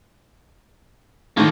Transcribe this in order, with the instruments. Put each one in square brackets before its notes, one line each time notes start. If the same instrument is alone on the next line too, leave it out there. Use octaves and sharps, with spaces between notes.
[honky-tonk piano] A2 D#3 [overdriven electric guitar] F3 A#3